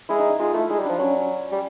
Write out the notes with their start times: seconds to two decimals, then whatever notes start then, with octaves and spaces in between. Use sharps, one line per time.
0.09 G#3 E4
0.19 D#4
0.29 D#4
0.39 G#3 F4
0.54 A3 E4
0.69 G#3 D#4
0.79 G3
0.84 F3 D4
0.99 F#3 C#4
1.14 C#4
1.52 G3